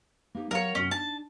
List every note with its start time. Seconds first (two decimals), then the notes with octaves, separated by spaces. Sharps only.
0.35 A#3 D#4 G4
0.51 F#3 A#4 C#5 F5
0.75 F#2 C3 C#4 F#4
0.91 D4 D#4 A5